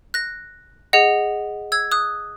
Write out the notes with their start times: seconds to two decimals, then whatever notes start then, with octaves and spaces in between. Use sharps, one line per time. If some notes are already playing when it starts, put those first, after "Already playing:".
0.14 F#6 A#6
0.93 G#4 D#5 F#5
1.72 E6 G#6
1.92 D#6 F#6